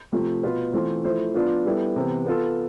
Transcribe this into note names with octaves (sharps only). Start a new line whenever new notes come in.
C3 F3 A3
B2 B3 F4 B4
E3 A3 C4 F4 C5
F3 A3 E4 A4 C5
F3 B3 D4 F4
G3 B3 E4 A4
C3 E3 B3
B3 F4 A4